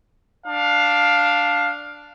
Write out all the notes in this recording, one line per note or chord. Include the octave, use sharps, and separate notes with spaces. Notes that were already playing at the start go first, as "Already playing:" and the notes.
D4 F5